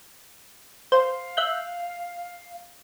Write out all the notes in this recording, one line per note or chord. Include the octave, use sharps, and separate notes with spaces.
C5 F5
E5 F#6 G6